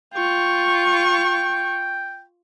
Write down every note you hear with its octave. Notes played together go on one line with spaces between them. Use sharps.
F4 G5 C#6